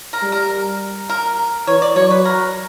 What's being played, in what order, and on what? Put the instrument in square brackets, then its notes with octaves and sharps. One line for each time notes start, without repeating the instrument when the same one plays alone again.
[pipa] A#4
[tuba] G3
[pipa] A#4
A#4
[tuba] E3 [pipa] C#5
[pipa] D5
[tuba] F#3 [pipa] C#5
[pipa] B4
A#4